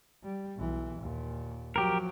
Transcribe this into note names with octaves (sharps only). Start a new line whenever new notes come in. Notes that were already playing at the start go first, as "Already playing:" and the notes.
G3
B1 E3
D#2 A#2
F3 F#3 G4 A#4